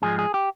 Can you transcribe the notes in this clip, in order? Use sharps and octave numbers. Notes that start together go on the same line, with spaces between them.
G#2 F3 G#3 G#4
G#4
G4